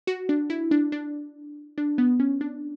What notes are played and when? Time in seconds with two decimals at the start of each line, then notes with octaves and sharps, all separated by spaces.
0.07 F#4
0.29 D4
0.50 E4
0.71 D4
0.92 D4
1.78 D4
1.98 B3
2.20 C#4
2.41 D4